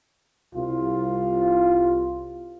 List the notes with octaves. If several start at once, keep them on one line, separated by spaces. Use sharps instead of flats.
C2 F4